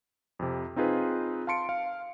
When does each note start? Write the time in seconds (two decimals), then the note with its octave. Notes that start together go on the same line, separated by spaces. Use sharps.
0.39 F2 C3
0.76 C4 D#4 F4 G#4 B4
1.47 F5 A5 C6 C#7 D7
1.69 F5